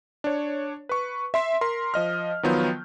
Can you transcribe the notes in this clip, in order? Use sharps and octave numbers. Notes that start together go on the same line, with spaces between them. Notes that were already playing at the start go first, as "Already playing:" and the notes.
D4 C#5
B4 C#6
E5 C6 B6
A#4 C6
F3 D#5 F6
D#3 F3 F#3 B3 F4 G6